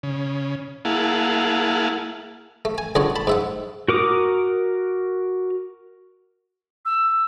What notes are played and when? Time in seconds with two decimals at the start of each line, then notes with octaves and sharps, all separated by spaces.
0.03 C#3
0.85 A#3 E4 G#4 F5 F#5 A5
2.65 A3
2.78 G#5
2.95 C#2 D3 D4 C#5 F#5
3.16 A5 B5
3.27 G#2 E5 F#5
3.88 F#4 A#4 D6 D#6
6.85 E6